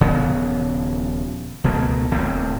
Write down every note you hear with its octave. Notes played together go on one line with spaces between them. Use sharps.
D#1 C#3 F3 B3
C#2 B2 A3 A#3
D#1 D2 A2 C4